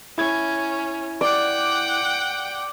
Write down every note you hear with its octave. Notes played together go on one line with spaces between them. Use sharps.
C#4 E4 G#6
D5 F#5 G5